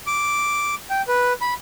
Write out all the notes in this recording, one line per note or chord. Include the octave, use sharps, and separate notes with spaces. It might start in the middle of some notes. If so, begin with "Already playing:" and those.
D6
G5
B4
B5